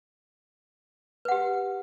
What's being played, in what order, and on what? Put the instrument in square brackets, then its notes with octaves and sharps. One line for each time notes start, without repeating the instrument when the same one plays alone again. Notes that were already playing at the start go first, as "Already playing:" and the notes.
[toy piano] B4
F#5
G4